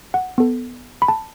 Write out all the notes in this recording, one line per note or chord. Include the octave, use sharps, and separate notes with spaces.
F#5
B3 A4
B5
A5